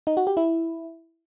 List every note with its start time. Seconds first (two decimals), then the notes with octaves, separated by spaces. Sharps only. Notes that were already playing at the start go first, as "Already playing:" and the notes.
0.07 D#4
0.17 F#4
0.27 G4
0.37 E4